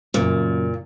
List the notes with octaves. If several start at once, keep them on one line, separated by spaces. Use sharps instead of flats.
F#2 A#2 C#3